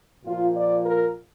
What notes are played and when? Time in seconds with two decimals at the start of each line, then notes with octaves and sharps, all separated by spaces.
0.25 A#2 F3 F4
0.55 D5
0.85 A#4